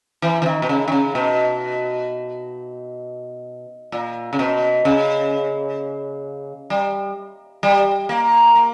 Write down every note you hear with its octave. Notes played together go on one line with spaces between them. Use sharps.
E3
E3
D#3
B2
C#3
D#3
C#3
B2
A#2
C#3
B2
C#3
G3
G3
A#3
A#3